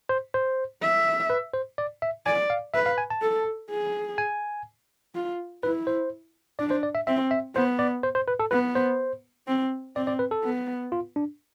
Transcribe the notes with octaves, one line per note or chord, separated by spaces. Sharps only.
C5
C5
E5
B4
C5
D5
E5
D5 G#5
F5
B4 E5
F5
G#5
A5
A4
G#4
G#5
F4
E4 B4
C5
D4 D5
C5
D5
E5
C4 E5
E5
B3 C5
D5
C5
C5
B4
A4
B3 B4
C5
C4
C4 D5
D5
B4
A4
B3
F4
D4